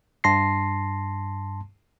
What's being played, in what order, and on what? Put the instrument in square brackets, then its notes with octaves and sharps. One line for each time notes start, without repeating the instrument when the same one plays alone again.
[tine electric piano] G2 A5 C6 A#6 C7